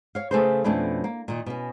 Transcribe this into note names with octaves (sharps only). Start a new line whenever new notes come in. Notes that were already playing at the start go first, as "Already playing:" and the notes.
C#5 F5
C#3 A3 G#4 A4 B4 C5
F2 B2 A3 C#4 D4 E4
A#3
A#2 D#3
B2 C#4